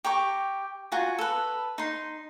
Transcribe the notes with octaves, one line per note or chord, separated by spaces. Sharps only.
G4 A#5 C#6 D6
F4 F#4 G#5 A#5
A4 B4
D#4 C6